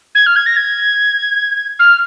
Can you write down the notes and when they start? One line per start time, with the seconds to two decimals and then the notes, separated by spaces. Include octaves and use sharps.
0.15 G#6
0.26 F6
0.36 G#6
0.46 A#6
0.56 G#6
1.79 F6